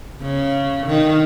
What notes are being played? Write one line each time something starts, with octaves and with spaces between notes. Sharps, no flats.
C#3
D#3